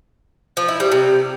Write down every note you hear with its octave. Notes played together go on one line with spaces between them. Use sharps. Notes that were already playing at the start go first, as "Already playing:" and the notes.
F3
E4
G3
C3